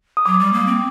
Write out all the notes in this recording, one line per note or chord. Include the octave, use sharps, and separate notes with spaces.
D#6
F#3 D6
G3
A#3
C4